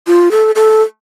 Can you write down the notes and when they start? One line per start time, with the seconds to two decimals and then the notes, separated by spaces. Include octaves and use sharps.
0.07 F4
0.31 A4
0.55 A4